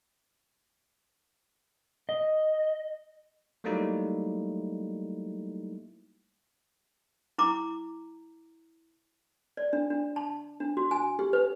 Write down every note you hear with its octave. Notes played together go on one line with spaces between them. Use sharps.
D#5
F#3 G3 A3 A#3 D#4 E4
E4 A#5 D6
D5
D4
D4
A5
D4
F#4
G#5
G4
B4